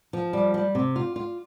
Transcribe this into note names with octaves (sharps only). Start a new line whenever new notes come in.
F3
G3
G3
C3
F4
F4